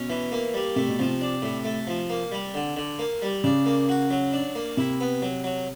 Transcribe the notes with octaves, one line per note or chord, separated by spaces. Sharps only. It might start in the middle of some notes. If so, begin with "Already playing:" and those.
Already playing: B2 C#4
E3
A#3
G3
C3 A3
B2
C3 F3
D4
A2
A3
F3
A#3
G3
D3
D3
A#3
G3
C#3 D4
A#3
F#4
F#3
D4
A#3
C3 E4
B3
F#3
F#3